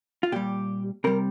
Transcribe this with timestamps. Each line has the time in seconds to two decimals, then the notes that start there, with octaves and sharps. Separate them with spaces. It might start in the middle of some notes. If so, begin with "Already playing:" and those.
0.23 F4
0.32 A#2 G3 G4
1.04 C3 G3 A#4